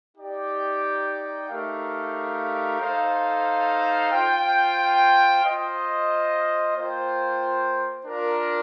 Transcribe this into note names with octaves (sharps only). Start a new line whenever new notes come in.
D#4 G4 D5 G5
A3 D#4 G4 A#4 F5
D#4 A4 C5 F5
F4 C5 G5
F4 C5 D#5
A#3 F4 C5 G5
D4 F4 A#4